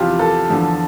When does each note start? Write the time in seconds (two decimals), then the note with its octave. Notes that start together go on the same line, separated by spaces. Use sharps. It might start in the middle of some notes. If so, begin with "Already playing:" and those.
Already playing: E2 C3 F3 E4 F4 G4
0.19 A4
0.49 E2 D3 F3